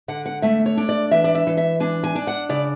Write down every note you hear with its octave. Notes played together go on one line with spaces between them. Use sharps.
D3 F#5
F#5
A3 E5
C#5
D4
D5
E3 E5
D5
E5
E3
E5
D4 G#5
G#5
D4
F#5
C#3 D5